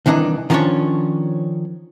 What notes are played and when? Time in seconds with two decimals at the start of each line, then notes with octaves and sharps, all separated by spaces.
0.06 C2 D#3 E3 D4 D#4
0.50 D#3 F3 A#3 C#4 D4 C#5